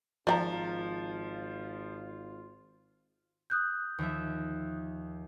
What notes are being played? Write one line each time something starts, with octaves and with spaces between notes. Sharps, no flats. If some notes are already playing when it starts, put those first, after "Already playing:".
G#1 F3 D#4 F4 D5 E5 A#5
D#6 F#6 G6
D#2 F3 E5